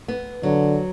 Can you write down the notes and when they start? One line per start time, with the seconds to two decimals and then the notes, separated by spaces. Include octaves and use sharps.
0.08 B3
0.43 D3 F#3